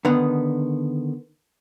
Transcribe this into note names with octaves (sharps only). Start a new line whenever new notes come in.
D3 D#3 B3